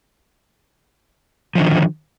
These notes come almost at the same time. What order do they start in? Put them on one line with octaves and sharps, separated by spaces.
F3 D3 D#3